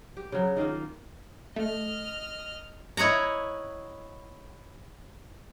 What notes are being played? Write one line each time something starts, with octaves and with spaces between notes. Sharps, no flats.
G4
C#3 F#3
D#3 A#3 D#4 F4
A3 D#5 F6
E4 C#5 D#5 F#5 A#5